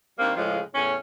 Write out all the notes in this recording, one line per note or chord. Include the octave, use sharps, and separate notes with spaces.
D#3 G3 A#3 C4 D4
A2 C#3 F3 G#3
E2 A2 C#4